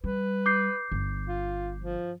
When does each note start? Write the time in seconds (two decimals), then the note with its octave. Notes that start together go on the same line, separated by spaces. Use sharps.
0.04 G3 B4
0.46 D6 G6 C7
0.92 G1
1.27 F4
1.77 F3